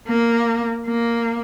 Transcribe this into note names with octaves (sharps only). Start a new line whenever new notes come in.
A#3
A#3